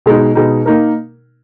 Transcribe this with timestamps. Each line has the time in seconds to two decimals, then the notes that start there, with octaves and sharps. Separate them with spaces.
0.06 B2 G#3 D#4
0.35 B2 G#3 D#4
0.66 A#3 D#4 A#4